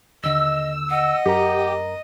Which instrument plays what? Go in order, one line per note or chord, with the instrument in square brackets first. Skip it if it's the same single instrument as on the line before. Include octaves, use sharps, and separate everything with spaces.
[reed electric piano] D#2 D3 [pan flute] D#5 [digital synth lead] E6
[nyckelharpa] D#5 D#6 [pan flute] F#5
[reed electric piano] F#2 A#4 A#5 [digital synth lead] G4